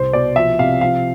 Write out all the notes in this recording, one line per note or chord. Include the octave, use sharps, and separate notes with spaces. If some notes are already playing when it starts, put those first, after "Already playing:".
Already playing: C2 C5
B2 D5
F3 E5
C3 F5
F3 F5